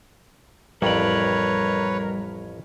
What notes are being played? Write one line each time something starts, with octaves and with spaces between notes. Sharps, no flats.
A1 F2 G3 A#4 B4 C#5 D5